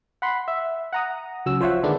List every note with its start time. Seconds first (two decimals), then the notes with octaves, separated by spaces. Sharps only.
0.22 F#5 B5 C6
0.48 E5
0.93 F#5 A#5 D#6
1.46 C#2 F#3 C#4 E6
1.61 F3 C5 C#5 E5 F#5
1.83 D3 D#3 G#3 B3 D4